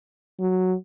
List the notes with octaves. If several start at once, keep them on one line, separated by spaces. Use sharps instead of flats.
F#3